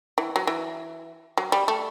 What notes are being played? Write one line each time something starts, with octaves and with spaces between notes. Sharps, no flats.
E3
F#3
E3
F#3
G3
A3